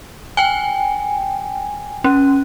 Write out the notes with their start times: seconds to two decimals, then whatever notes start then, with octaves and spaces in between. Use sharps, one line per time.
0.37 G5 G#5
2.04 C#4